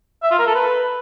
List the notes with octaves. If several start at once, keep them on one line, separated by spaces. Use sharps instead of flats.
E5
F4
A#4
A4
B4